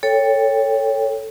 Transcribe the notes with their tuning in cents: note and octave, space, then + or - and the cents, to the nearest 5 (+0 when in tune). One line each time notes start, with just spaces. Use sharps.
A4 +0 C#5 +0 G5 +15